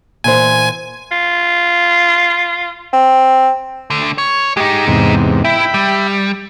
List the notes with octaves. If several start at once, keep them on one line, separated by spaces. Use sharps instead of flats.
A#2 E3 C5 G#5
F4
C4
D3 A3
C#5
G#3 D#4 G4
E2 G#2 C3
E4 E5 G5 B5
G3